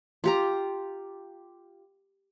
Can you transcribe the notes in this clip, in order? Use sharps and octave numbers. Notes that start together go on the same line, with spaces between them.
F4 G4 A#5